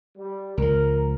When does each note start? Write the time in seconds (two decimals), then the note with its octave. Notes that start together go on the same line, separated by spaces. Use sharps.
0.18 G3
0.58 C#2 F3 A#4